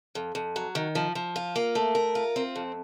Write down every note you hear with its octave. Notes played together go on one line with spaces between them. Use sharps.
F2
F2
F#3
D#3
F3
F3
F4
A#3
A3
A#4
F4
C4
F2